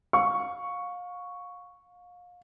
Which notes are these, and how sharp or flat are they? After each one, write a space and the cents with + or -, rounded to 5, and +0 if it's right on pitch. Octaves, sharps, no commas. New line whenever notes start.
F5 +30 C#6 +0